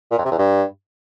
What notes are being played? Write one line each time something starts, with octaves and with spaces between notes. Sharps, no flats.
A#2
F2
C3
E2
G2